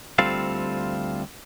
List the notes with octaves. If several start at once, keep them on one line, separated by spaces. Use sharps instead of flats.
D2 G3 C4 F4 A4 F5